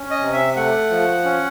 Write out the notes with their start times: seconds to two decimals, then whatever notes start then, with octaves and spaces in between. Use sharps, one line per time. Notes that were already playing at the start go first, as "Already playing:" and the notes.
Already playing: C#4
0.11 D#5
0.21 C3
0.33 E5
0.56 A3 F#5
0.90 F3
1.24 C#4